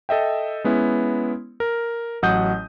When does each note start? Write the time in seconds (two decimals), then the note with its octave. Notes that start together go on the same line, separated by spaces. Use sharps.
0.09 A4 D#5 E5 G5
0.64 G#3 B3 C#4 E4
1.60 A#4
2.22 A1 F#3 D#5 F#5 D#6 G6